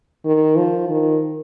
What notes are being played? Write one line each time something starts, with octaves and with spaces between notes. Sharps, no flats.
D#3
F3
D#3